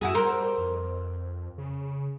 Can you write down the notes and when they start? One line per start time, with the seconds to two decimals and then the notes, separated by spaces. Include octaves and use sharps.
0.01 F#2 E4 F#4 G#4
0.15 G3 A#4 C5
0.58 F2
1.58 C#3